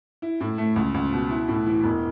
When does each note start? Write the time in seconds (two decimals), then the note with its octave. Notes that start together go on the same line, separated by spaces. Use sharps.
0.22 E4
0.40 A2
0.58 A3
0.76 C#2
0.94 C#2
1.12 B2
1.30 E4
1.48 A2
1.66 E3
1.84 E1